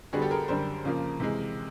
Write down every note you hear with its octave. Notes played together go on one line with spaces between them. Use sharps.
D3 G3 B3 F#4 G#4
G4 A4
G#4 A#4
F#2 D3 G3 A#4 C5
F2 C#3 F3 A#3
C3 E3 G#3